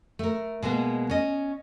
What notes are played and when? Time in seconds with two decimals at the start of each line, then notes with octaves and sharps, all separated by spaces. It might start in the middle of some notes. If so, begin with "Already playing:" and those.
0.19 A3 A#4
0.62 B2 G#3 A#3 B3
1.10 C#4 D#5